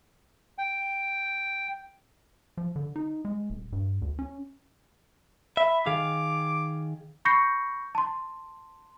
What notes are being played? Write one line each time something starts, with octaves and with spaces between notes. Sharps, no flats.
G5
F3
D3
D#4
G#3
D#1
G2
D2
C#4
E5 B5
D#3 G#4 F5 D6
B5 C#6 G6 A#6 C7 C#7
A5 C6